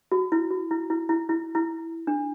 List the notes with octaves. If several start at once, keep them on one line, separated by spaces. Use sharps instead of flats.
F#4
E4
F#4
E4
E4
E4
E4
E4
D4